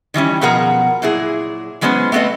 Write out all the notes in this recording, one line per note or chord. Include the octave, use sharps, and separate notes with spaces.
D#3 E3 G3 C#4
B2 F3 G#4 A#4 F#5 A#5
A#2 F#3 E4 G#4
E3 F#3 G#3 B3 C#4 C5
A3 B3 C4 A4 D#5